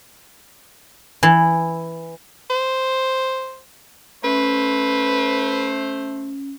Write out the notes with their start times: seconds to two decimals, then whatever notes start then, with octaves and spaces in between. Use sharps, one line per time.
1.23 E3
2.50 C5
4.24 A3 C#4 B4 C5